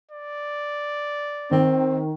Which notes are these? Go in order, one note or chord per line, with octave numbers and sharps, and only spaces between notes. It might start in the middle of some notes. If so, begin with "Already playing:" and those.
D5
D#3 C4